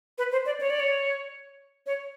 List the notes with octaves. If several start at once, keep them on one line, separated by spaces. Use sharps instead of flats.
B4
C5
D5
C#5
D5
C#5
C#5